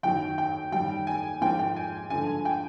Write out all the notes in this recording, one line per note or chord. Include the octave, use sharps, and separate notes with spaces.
F#2 D#3 F#3 G5
G5
F#2 D#3 G3 G5
G#5
G#2 F3 A#3 G5
G5
G#5
G2 D3 F3 G#3 G#5
G5